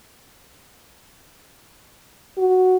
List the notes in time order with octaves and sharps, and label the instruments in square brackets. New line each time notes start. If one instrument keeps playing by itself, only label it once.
[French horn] F#4